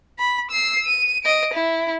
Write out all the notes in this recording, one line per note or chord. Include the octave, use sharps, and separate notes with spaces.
B5
E6 C7
D#7
D#5 D7
E4